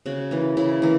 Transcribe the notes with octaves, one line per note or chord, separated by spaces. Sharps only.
C#3 F#4
E3 A#3
C#3 E4
E3 A#3